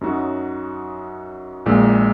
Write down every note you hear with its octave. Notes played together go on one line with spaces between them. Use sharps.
F#2 F#3 D#4 F#4
A#1 A#2 G#3